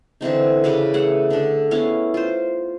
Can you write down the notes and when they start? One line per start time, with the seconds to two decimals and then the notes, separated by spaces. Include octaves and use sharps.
0.21 D3 E3 C4 D#4
0.64 C#3 B4 D6
0.94 A3 G#4 F#5
1.30 D3 D4
1.71 B3 C#4 E4 F5
2.14 F4 C5